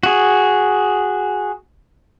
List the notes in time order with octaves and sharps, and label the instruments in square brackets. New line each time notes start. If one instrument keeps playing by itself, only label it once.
[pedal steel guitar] F#4 G#4